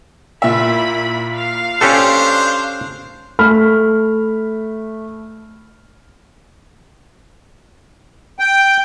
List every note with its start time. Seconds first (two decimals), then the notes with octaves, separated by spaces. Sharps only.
0.42 A#2 E4 E5 B5
1.36 F5
1.81 C#4 D4 G4 A4 C5
3.39 A3 B5 F6
8.39 G5